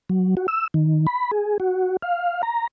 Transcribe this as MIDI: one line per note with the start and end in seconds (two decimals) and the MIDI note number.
0.09 0.35 54
0.37 0.47 66
0.48 0.68 88
0.74 1.07 51
1.07 1.31 83
1.31 1.58 68
1.60 1.97 66
2.02 2.42 77
2.43 2.67 82